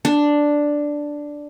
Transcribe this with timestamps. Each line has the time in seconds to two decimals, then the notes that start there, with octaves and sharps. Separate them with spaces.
0.05 D4